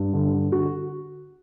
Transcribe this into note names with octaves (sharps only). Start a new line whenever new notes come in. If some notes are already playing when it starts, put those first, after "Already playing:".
Already playing: G2
D3
D3
D3 F#4